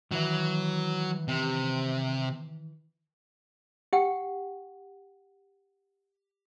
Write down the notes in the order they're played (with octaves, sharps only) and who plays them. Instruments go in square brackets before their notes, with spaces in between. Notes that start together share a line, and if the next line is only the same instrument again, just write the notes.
[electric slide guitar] D#3 E3 E5 [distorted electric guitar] F#3
[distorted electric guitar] C3
[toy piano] G4 F#5 G5